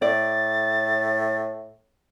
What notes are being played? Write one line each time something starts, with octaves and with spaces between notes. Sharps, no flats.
A2 D5 A6